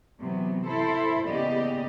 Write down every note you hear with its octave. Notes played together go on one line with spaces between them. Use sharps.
C3 E3 F#3 B3
E4 A4 C5
C#3 A#3 B3 G4 D5 D#5